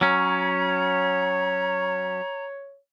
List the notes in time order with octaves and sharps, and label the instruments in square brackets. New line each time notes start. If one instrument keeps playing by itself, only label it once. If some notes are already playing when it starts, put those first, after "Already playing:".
[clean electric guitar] F#3 C#4 [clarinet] C#5 [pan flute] A#5